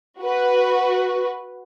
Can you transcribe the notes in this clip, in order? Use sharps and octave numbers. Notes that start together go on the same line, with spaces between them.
F#4 B4